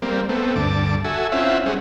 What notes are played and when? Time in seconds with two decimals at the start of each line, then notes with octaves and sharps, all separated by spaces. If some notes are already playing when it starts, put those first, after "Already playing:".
0.02 G3 A#3 C4
0.29 A3 B3 C4
0.56 D2 G2 A5 D6
1.04 F#4 A4 E5 G#5
1.32 C4 C#4 E4 F4 E5 F#5
1.66 G3 C4 C#4 G#4 F#5